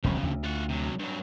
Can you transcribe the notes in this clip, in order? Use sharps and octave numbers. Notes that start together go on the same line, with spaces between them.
E1 C2 C#3 F3
D2
F4 F#5
C3 F#3
G2 F#3